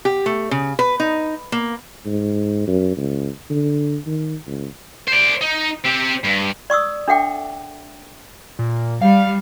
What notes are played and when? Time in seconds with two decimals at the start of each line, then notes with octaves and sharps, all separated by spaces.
0.05 G4
0.26 A3
0.51 C#3
0.79 B4
1.00 D#4
1.52 A#3
2.06 G#2
2.67 F#2
2.97 C#2
3.50 D3
4.06 D#3
4.46 C#2
5.08 C5 D5
5.41 D#4
5.84 C4 G4
6.24 G2
6.70 D5 C#6 D#6 E6
7.08 D4 A4 E5 F#5 G5 D6
8.59 A#2
9.02 G3 F5